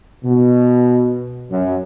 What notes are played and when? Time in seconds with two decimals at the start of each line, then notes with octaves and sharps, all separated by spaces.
0.25 B2
1.51 F#2